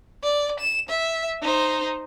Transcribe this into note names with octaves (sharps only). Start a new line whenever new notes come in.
D5
E7
E5
D#4 C5